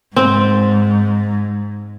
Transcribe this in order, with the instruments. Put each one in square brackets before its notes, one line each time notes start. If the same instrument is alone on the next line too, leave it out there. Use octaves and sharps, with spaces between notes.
[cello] G#2 [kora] C4